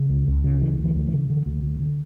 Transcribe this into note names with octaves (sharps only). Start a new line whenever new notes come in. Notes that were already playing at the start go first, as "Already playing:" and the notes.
Already playing: C#3
C#2
C#2
C#3
C#3 E3
D2
E3
D2
E3
C#3
D3
D2
D2
D3